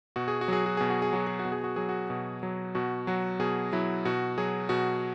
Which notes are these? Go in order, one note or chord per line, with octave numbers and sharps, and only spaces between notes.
B2 F#4
G#4
F#4
F#3 G#4
F#4
B2 G#4
F#4
G#4
F#3 F#4
G#4
F#4
B2
G#4
F#4
F#3 G#4
F#4
B2
F#3
B2 F#4
F#3 F#4
B2 G#4
F#3 E4
B2 F#4
F#3 G#4
B2 F#4